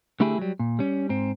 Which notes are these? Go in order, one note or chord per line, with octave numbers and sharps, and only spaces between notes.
D3 A3 E4 G4 G#4
F#3 G3
A#2
G3 C#4
G#2 C4